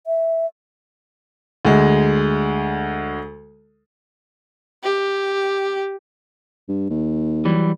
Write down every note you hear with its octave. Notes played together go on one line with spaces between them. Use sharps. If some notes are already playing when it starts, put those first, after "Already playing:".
E5
D2 G#3
G4
G2
D#2
E3 F#3 G3